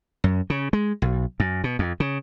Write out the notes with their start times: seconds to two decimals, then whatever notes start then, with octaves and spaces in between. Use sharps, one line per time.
0.24 F#2
0.50 C#3
0.73 G#3
1.02 B1
1.40 F#2
1.64 B2
1.79 F2
2.00 C#3